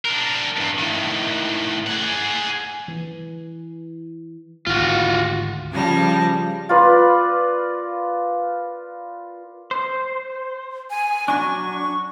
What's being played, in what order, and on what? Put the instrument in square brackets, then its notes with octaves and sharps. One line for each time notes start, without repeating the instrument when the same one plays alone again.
[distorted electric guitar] D4 A#4
E2 G2
A2 D#3
G#4 F#5
[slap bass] E3
[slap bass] G#1 D2 [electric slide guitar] F4 F#4
[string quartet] C#3 F3 G3 A5 A#6
[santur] F4 A#4 B4 D5
[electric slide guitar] C5
[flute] G#5
[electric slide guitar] F#3 D4 [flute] C#6